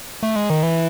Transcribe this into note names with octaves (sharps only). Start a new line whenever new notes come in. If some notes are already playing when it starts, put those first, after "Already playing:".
A3
G#3
D#3
E3